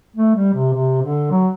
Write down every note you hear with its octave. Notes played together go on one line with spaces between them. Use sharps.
A3
G3
C3
C3
D3
F#3